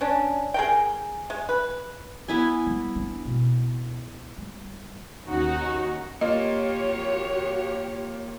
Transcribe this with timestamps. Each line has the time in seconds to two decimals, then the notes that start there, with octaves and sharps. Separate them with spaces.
0.01 C#4 D4
0.54 G#4 A#4 G5
1.30 G#3
1.49 B4
2.28 B3 E4 G#5
2.66 G3
2.96 D4
3.25 B2
4.38 G3
5.27 D#2 C#4 D#4 F#4
6.21 A#3 F4 G4 C#5 D#5